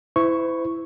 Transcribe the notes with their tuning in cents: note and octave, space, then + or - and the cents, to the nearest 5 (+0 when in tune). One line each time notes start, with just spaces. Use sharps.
E4 +0 C5 -45 C#6 +0